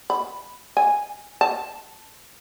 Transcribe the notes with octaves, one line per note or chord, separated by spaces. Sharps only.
B5
G#5
A5